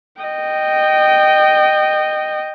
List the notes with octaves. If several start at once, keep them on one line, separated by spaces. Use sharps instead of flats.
D#5 G5